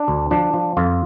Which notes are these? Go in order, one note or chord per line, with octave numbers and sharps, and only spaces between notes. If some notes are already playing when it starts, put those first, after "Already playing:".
Already playing: D4
D2
F3 D4
F3
F2 F4